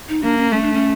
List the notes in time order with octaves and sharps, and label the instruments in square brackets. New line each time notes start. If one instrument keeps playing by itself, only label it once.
[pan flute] D#4
[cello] A#3 [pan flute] D4
[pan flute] C#4
[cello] A3 [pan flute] C#4
[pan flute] D4
C#4